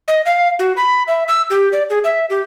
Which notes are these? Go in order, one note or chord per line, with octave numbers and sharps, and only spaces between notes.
D#5
F5
F#4
B5
E5
E6
G4
D5
G#4
E5
G4